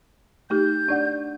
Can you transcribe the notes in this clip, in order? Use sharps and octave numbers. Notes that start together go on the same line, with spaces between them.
A3 D#4 G4 G6
D4 D5 F#5